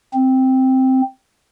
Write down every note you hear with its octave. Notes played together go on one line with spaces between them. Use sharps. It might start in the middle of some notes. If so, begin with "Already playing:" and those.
C4